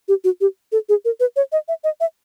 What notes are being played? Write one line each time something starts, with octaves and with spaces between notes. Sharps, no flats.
G4
F#4
G4
A4
G#4
A#4
B4
C#5
D#5
E5
D#5
E5